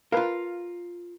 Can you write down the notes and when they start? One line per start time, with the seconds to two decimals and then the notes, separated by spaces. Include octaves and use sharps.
0.12 F4 A#4 B4 F5